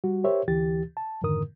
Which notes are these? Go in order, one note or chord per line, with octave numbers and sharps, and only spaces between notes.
G3 F#4
G4 A#4 C5 C#5 E5
D2 E3 G4 A6
A5
F2 G#2 D3 D#3 A#4 D#6